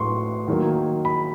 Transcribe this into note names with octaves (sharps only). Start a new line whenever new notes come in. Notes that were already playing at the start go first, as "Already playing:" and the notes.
Already playing: A2 F#3 B3 C6 C#6
D#3 F#3 A#3
B5